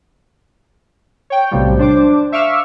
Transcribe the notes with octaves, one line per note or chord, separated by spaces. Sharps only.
C#5 G5
B1 A2 C3 F3 G3
D4 C5 D6
E5 F5 C#6 D6 E6 F6